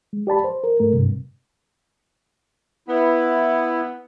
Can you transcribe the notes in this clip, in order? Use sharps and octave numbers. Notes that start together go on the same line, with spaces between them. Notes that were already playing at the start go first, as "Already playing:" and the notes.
G#3
G4 D5 A5 B5
C5
A#4
G#2 A3 A#4
G2 C3
B3 E4